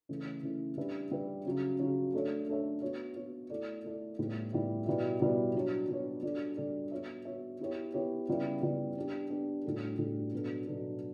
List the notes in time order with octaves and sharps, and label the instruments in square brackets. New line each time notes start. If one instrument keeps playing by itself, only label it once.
[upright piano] C#3 E3 A3 C#4 E4
C#3 E3 A3 C#4 E4
G3 D4 G4 B4 E5
G3 D4 G4 B4 E5
C#3 F#3 C#4
C#3 F#3 C#4
A3 D4 A4 C#5 E5
A3 D4 A4 C#5 E5
B3 F#4 C#5
B3 F#4 C#5
A3 E4 A4 D5
A3 E4 A4 D5
A2 G3 B3 E4
A2 G3 B3 E4
B2 G3 B3 E4
B2 G3 B3 E4
F#3 B3 D4 F#4 C#5
F#3 B3 D4 F#4 C#5
G3 D4 F#4 A4 D5
G3 D4 F#4 A4 D5
B3 F#4 C#5 E5
B3 F#4 C#5 E5
B3 E4 G4 C#5
B3 E4 G4 C#5
C#3 G3 B3 E4
C#3 G3 B3 E4
B3 D4 G4
B3 D4 G4
A2 G3 D4 F#4 A4
A2 G3 D4 F#4 A4
B2 F#3 B3 D4 A4
B2 F#3 B3 D4 A4